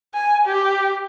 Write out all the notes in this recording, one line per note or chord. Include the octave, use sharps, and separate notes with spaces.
G#5
G4